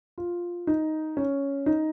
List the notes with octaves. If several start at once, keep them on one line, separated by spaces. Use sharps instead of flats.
F4
D#4
C#4
D#4